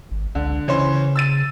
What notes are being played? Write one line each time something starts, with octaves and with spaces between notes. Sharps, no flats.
G#1
C#2 D3
C#3 E3 C#4 C5
E6 A6 D#7